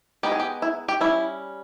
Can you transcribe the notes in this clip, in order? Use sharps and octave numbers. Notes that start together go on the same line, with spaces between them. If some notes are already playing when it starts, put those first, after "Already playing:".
G#3 B3 D#4 G4
G#4
G4
E4
G4
G3 C#4 E4